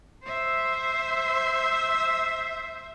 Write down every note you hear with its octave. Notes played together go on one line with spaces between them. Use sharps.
C5 E5